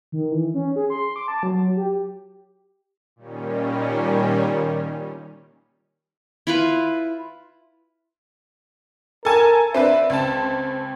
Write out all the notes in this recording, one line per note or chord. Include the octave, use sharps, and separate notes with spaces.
D#3
E3
C#4
G#4
C6
D6
A5
F#3
G4
A#2 D#3 G3 C#4
E4 F4 B4
A4 A#4 G#5 A5
C4 D4 B4 E5
C#2 C4 A5